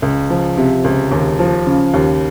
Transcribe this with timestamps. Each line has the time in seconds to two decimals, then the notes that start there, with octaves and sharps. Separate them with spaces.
0.02 C#2
0.30 F3
0.57 C3
0.84 C#2
1.11 D#2
1.39 F3
1.67 C#3
1.94 D#2